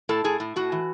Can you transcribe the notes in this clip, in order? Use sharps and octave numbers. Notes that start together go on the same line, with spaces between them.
A2 A4
A2 G#4
A2
A2 F#4
E3